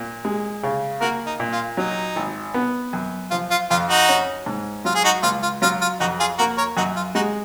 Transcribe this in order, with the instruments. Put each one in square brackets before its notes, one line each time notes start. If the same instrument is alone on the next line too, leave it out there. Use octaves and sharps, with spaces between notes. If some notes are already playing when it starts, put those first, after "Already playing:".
Already playing: [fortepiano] A#2
G#3
C#3
[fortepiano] A#3 [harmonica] F#4 A#4
[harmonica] D#4
[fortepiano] A#2
[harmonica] F4
[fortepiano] F#3 [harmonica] D#4
[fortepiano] G#1
B3
F#2
[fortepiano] F3 [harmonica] F4
[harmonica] F4
[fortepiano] F2 [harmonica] F4
[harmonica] D#4 F#4
[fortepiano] C#4
G#2
[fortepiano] F#3 [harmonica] F4
[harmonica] G#4
D#4 F#4
[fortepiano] C#2 [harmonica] F4
[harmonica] F4
[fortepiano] F#3 [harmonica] F4
[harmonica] F4
[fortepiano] F2 [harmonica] D#4 F#4
[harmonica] F4 G#4
[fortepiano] A#3 [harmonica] F#4 A#4
[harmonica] A#4 C#5
[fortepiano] F#2 [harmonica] D#4 F#4
[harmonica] F4
[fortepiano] G#3 [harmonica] D#4 F#4